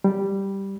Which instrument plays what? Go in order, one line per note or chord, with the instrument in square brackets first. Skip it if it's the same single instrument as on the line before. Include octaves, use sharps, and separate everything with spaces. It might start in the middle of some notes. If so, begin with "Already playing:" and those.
[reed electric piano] G3